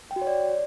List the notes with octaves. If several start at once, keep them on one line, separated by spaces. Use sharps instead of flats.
G5
F#4
C#5
D5